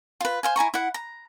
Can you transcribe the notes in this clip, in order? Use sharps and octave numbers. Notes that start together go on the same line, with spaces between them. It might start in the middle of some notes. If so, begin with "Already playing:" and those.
F4 B4
C5 F5 G#5
E4 G#5 A#5 C#6
E4 F#5
A#5